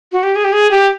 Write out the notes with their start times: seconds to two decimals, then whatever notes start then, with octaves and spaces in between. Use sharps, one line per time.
0.12 F#4
0.23 G4
0.36 G#4
0.44 G4
0.53 G#4
0.71 G4